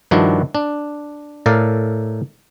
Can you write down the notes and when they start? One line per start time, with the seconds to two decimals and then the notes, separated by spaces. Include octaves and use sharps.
0.11 G2 D#3 F3 D4 E4 F#4
0.55 D4
1.46 A2 A4 A#4 D5 F5